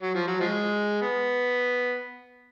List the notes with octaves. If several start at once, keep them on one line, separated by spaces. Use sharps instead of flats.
F#3
F3
F#3
F3 G#3
B3